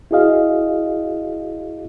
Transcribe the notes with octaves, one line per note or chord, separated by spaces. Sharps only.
E4 F#4 G#4 D#5 F5